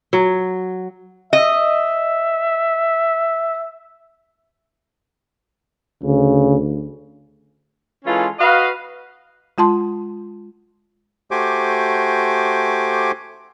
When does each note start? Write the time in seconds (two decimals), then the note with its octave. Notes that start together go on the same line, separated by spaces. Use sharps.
0.13 F#3
1.33 D#5 E5
6.03 D2 C#3
8.05 E3 G#3 C#4 F4 A4
8.39 F#4 B4 D#5 F5
9.58 G#3 F4 A5 C6
11.31 A3 F#4 G4 C5 G#5 D6